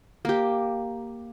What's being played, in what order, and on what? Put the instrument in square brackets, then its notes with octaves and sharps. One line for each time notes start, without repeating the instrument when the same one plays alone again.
[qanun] A#3 G4